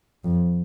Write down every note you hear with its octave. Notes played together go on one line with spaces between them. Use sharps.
F2